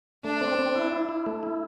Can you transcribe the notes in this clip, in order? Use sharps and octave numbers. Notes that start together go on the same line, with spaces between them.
A3 D4
C4
C4
E4
E4
E4
A3
E4